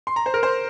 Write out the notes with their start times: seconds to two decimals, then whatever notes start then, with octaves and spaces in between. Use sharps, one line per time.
0.07 C6
0.16 A#5
0.26 C5
0.34 A#4
0.43 C5